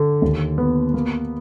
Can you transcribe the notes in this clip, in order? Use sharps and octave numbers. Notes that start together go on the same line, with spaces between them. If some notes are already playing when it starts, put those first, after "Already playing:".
Already playing: D3
D#2
B3
A#3